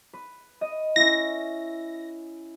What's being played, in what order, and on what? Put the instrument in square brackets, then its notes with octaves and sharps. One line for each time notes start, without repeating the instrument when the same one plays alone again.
[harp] B4
D#5
[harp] C#4 E4 [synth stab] A#6